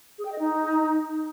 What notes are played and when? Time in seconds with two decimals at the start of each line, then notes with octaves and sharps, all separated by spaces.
0.18 G#4
0.25 G5
0.32 D#5
0.39 D#4